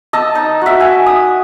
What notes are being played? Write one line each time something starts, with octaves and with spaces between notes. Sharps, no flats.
D#5 A5 E6
D#4
F#4 E5
G#5
D#6